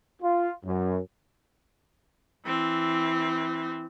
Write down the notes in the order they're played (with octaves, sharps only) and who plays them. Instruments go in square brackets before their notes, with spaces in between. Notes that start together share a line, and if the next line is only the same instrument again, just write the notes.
[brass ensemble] F4
F#2
[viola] E3 C4